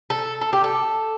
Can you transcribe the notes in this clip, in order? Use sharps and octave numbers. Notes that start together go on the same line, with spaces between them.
A4
A4
G4
A4